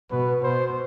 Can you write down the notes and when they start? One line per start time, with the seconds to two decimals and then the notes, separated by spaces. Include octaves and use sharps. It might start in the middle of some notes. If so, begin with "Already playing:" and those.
0.11 B2 B4
0.43 B2 C5